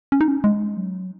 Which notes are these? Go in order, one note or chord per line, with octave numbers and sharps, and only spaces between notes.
C#4
D#4
C#4
G#3
F#3